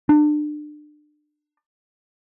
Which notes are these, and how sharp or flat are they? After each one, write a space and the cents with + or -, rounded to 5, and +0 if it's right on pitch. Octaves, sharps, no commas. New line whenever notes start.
D4 +30